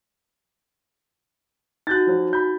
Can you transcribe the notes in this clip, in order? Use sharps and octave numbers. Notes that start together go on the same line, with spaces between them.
D#4 F#4 F#6 G6 A6
F3 F#3
B5 G6